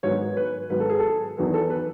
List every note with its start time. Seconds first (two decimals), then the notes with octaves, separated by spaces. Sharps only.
0.03 G#2 D#3 F#3 B3 C#5
0.37 B4
0.70 G#2 D#3 F#3 B3 B4
0.80 A4
0.89 G#4
0.99 A4
1.37 E2 D#3 F#3 B3
1.54 A4
1.70 B4